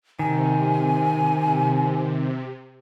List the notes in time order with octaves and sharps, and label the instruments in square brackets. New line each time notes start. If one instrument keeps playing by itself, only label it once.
[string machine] C3 [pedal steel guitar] D#3 [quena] G#5